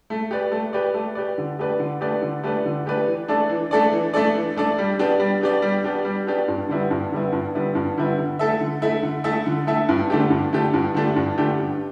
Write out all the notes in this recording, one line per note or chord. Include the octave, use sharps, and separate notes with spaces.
A3
G4 B4 D5
A3
G4 B4 D5
A3
G4 B4 D5
D3
A3 G4 B4 D5
D3
A3 G4 B4 D5
D3
A3 G4 B4 D5
D3
A3 G4 B4 D5
E3
A3 D4 A4 D5
E3
A3 D4 A4 D5
E3
A3 D4 A4 D5
E3
A3 D4 A4 D5
G3
B3 D4 G4 D5
G3
B3 D4 G4 D5
G3
B3 D4 G4 D5
G3
B3 D4 G4 D5
G2
D3 G3 B3 E4
G2
D3 G3 B3 E4
G2
D3 G3 B3 E4
G2
D3 G3 B3 E4
D3
A3 E4 A4 E5
D3
A3 E4 A4 E5
D3
A3 E4 A4 E5
D3
A3 E4 A4 E5
G2
D3 A3 D4 G4
G2
D3 A3 D4 G4
G2
D3 A3 D4 G4
G2
D3 A3 D4 G4
G2